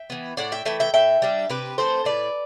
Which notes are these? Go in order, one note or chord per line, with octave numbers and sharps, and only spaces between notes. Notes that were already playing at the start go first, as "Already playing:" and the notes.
Already playing: E5 G5
E3 B3
A2 D5 F#5
E5 G5
E3 A3 E5 G5
E5 G5
A2 E5 G5
G3 D4
C3 G4 B4
E3 A3 C4 A4 C5
A2 B4 D5